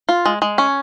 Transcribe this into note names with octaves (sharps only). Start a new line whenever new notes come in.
F4
G#3
G#3
C#4